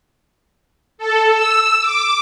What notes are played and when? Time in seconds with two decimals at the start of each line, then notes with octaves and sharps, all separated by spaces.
0.98 A4
1.33 E6
1.80 D6